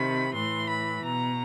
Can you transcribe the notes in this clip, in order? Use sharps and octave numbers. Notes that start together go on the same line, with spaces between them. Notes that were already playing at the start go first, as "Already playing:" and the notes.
Already playing: C3 D#3 B5
A2 E3 C6
B5
B2 A#5